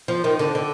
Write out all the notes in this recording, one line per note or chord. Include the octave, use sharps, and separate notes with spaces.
F3
D#3
D3
D3